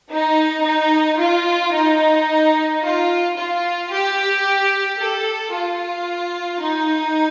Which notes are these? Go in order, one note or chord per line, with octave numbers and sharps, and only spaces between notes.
D#4
D#4
F4
D#4
F4
F4
G4
A4
F4
D#4